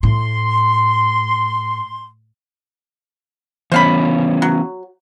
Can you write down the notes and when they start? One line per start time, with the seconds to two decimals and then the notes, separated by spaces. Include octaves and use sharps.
0.03 A2 C6
3.72 E3 B3 C#4 C5 F5 B5
4.42 F#3